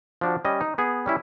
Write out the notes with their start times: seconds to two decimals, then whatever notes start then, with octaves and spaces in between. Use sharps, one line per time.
0.21 F3 D4 F#4
0.45 G3 C#4 D#5
0.61 D#4
0.78 B3 G#4
1.06 G3 C#4 E4